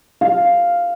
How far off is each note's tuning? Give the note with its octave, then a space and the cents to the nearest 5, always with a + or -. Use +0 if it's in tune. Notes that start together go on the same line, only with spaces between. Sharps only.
F5 +0